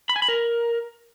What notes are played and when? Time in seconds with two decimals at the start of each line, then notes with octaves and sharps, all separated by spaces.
0.09 B5
0.16 G#5
0.22 B5
0.28 A#4